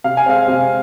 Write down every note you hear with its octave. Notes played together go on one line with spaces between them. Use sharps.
C3 F5
G#5
G#3 C4 F5
C3